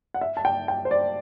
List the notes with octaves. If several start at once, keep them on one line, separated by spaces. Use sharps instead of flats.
F#5
E5
A5
G5
G5
C5
D5